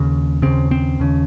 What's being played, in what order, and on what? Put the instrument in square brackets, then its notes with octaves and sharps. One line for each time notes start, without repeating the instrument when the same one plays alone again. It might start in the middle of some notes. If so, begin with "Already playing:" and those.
Already playing: [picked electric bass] D#2 C#3
D#2 C#3 C4
C4
D#2 C#3